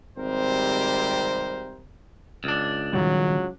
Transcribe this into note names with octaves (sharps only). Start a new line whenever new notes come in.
G#1 C3 G3 C4 A#4 C5
C#2 D4
D#1 D#3 F#3 G3